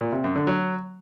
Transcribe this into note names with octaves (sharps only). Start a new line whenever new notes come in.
A#2
C3
F#2
D3
F#3